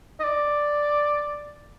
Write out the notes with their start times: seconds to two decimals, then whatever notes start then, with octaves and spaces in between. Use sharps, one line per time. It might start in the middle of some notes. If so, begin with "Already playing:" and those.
0.20 D#5
0.24 D5